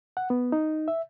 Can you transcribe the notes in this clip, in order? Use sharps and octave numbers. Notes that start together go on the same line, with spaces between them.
F#5
B3
D#4
E5